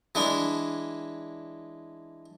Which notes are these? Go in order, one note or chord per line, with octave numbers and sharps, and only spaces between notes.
E3 G#3 D4